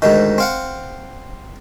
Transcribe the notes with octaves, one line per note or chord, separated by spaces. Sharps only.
D2 G#2 D#3
C4 F5 F#5